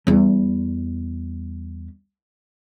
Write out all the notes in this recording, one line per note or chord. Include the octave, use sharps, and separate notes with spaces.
E2 G3